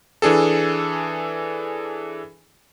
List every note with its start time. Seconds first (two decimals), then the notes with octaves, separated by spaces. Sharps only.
0.22 E3 D4 G#4 A4